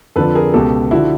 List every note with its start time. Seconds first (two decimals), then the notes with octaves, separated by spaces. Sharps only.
0.16 F2 D3 F3 A4 B4
0.35 G#4 A#4
0.54 C#2 B2 G4 A4
0.91 D3 F3 E4 F#4